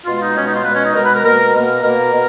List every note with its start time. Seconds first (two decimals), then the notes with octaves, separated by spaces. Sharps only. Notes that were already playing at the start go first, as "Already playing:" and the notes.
0.06 B2 G#3 F4
0.21 D#4
0.35 B2 G#3 C#4
0.45 D#4
0.54 F4
0.64 G#3 B4
0.69 B2
0.75 C#4
0.84 D#4
0.94 B2 G#3 A#4
1.04 B4
1.14 A#4
1.24 B2 A#3 A#4
1.53 B2 A#3 A#4
1.83 B2 A#3 A#4
2.13 B2